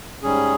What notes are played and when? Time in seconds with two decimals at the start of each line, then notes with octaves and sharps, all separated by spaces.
0.23 G#2 G3 C#4 G#4